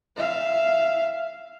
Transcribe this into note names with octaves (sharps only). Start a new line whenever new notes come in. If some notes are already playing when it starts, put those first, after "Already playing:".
E5 F5